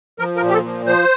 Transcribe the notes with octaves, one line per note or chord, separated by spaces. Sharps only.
F3 A#4
A#4
A#2
G4
A4
F3
F3 C5